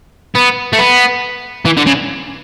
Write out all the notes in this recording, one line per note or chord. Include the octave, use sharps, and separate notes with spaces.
B3
A3
B3
E3
D3
C#3